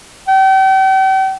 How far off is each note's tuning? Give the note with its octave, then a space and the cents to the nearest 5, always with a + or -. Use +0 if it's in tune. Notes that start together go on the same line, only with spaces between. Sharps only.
G5 -40